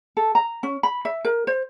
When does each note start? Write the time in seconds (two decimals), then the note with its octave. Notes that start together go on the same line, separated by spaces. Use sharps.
0.17 A4
0.35 A#5
0.63 C#4
0.83 B5
1.05 E5
1.25 A#4
1.47 C5